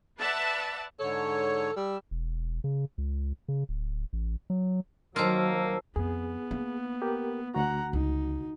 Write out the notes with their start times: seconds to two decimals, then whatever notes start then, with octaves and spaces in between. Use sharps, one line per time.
0.19 B4 D5 E5 F#5 A5
0.99 G#2 D3 A4 C#5
1.76 G3 E6
2.11 E1
2.64 C#3
2.98 C#2
3.48 C#3
3.69 D1
4.13 A1
4.50 F#3
5.16 D#3 F#3 A#3 F4 C5 A5 E6
5.96 F2 B3 G#4
6.51 A#3
7.02 G4 A#4
7.54 D2 F#4 F#5 A#5
7.93 C#2 G#3 D#4